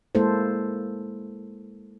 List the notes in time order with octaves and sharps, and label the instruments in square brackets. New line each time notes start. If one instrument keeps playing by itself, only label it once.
[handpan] G#3 A#3 E4 A4 C5